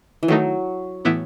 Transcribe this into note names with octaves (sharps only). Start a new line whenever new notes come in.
E3
D#3 F#3 A3 D#4
A2 E3 B3 E4